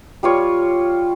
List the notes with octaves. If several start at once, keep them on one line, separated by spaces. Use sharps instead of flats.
G3 F4 C#5